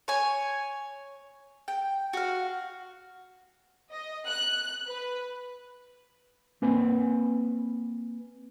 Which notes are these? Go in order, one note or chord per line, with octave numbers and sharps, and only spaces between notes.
C#5 G#5
G5
F#4 F5
D#5
F#6
B4
A#3 C4 B4 G#5